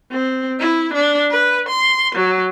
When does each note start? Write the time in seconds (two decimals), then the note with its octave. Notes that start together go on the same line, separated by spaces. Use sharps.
0.12 C4
0.60 E4
0.94 D4
1.31 B4
1.69 C6
2.15 F#3